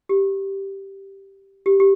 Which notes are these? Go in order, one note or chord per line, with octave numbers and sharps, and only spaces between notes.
G4
G4
G4